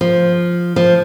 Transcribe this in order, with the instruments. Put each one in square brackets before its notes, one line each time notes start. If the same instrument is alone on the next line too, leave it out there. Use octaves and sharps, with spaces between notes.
[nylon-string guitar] F3
F3